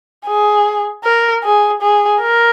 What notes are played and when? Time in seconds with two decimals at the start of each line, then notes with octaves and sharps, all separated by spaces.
0.26 G#4
1.04 A#4
1.43 G#4
1.82 G#4
2.21 A#4